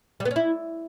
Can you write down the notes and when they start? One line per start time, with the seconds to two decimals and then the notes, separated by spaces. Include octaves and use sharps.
0.20 G3
0.25 B3
0.31 C#4
0.36 E4